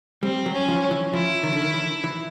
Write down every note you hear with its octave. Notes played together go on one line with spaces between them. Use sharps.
G3 C4
F#3
C#4
F3
E3
F3 E4
D#3
D3
D#3
E3
E3